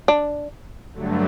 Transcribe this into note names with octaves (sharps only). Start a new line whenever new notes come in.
D4
G2 D3 F#3 A3